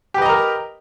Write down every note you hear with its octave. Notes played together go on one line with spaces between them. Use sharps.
G4 A#4 B4 D#5 A#5